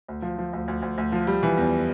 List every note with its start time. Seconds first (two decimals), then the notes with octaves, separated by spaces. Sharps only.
0.08 D2
0.22 F3
0.38 F3
0.53 D2
0.68 D2
0.82 D2
0.98 D2
1.12 F3
1.27 G3
1.43 E3
1.57 E2